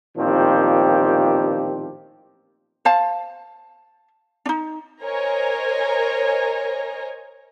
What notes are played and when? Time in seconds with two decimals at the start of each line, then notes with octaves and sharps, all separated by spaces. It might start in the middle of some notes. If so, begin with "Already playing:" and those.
0.17 A1 A#2 D#3 F3 C4 G4
2.85 C5 F5 A5
4.46 D4 D#4
5.02 A#4 C5 C#5 D#5 G#5 A#5